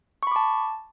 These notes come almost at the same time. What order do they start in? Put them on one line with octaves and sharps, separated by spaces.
C#6 B5 D6 A5